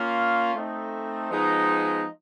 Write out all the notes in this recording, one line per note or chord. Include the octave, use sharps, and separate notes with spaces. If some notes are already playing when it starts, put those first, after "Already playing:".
Already playing: A#3 C#4 F4
A3 C4 D#4
F3 G#3 B3 D#4